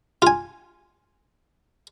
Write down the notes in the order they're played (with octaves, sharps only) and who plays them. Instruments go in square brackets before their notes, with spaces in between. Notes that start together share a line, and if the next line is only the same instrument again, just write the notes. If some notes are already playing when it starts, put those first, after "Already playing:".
[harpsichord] F4 G#5